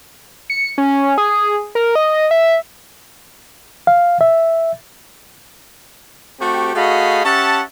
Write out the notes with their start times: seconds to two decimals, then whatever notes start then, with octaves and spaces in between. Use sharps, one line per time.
0.50 C#7
0.78 C#4
1.18 G#4
1.75 A#4
1.95 D#5
2.31 E5
3.87 F5
4.21 E5
6.40 A3 C4 F#4 G4
6.75 A3 F#4 G#4 D#5 F5 B5
7.24 C#4 G4 E5 F#5 A5